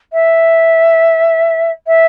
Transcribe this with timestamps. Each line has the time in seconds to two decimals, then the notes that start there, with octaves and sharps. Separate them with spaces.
0.12 E5
1.87 E5